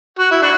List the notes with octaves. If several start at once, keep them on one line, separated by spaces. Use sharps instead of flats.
F#4
E4
D4 F#4